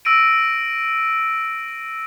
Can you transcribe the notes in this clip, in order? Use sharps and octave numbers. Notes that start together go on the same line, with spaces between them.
E6 A#6 D7 D#7